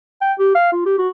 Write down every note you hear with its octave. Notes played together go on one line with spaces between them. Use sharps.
G5
G4
F5
F4
G4
F#4